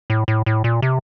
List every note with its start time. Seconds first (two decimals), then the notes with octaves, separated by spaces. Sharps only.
0.10 A2
0.28 A2
0.46 A2
0.64 A#2
0.82 C3